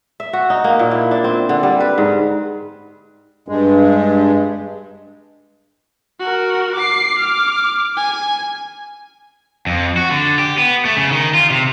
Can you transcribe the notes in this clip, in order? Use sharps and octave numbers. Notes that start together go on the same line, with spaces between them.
E5
F#4
D#4
A#3
A#2
E4
D4
C4
D3
G3
B4
G#2
G2 G#3
F#4 A#4
D6 C7
D6 F6
G#5
F2
F#4
D3
G4
B3
A3
C#3
D#3
F4
C3